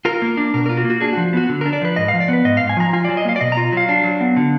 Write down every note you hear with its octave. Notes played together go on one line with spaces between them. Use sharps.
F4 A#4
A#3
D4
B2 A#4
F4 A#4
F#4
A#3
F#4
D4 G#4
F3 F#4
B3 F#4
D3
D4 A#4
D5
F3 B4
G#2 D#5
F5
F3
D5
B3 B4
G#2 D#5
G#2 F5
G#5
F3 A#5
F4 G#5
F#3 D5
D#5
A#3 F5
D5
B2 D#5
A#5
F4
F#3 F5
D4
F#3
B3
D3